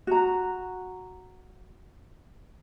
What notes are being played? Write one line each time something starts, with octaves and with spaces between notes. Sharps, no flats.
F#4 A#5